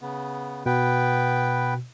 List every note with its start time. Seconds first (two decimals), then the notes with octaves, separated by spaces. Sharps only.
0.01 C#3 B3
0.66 B2 B3 B4 G5